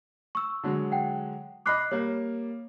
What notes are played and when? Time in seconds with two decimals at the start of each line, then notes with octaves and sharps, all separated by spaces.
0.35 C#6 E6
0.63 D3 F#3 G#3
0.92 F#5 G5
1.66 D#5 B5 D6 F6 F#6 C7
1.91 G3 A#3 C#5